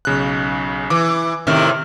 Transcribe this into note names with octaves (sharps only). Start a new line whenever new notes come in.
B1 C#3 F#6
E3 D6
A2 C3 D#3 E5 F6